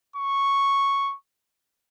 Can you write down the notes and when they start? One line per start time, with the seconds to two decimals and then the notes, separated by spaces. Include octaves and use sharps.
0.16 C#6